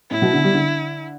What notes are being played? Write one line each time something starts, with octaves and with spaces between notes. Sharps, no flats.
A2 E4
B2
D3
G3
D3